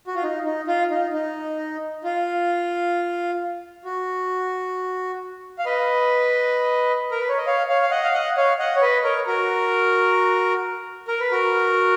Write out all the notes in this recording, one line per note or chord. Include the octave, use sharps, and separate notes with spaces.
F#4
F4
D#4
D#4
F4
D#4
D#4
F4
F#4
F5
B4 D#5
A#4
B4
C#5
D#5
C#5 F5
C#5 F5
F5
D#5 F#5
F5
D#5 F#5
C#5 F5
D#5 F#5
C#5
B4 D#5
A#4 C#5
F#4 A#4
A#4
B4
F#4 A#4